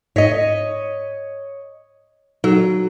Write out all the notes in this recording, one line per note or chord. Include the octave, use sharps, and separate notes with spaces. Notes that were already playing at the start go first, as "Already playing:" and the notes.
G#2 C#5 D#5 A#6 B6
F#3 D#4 A4